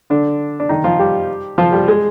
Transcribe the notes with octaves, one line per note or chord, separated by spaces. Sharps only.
D3 D4
D4
D#3 D#4
F3 F4
G3 G4
F3 F4
G3
G#3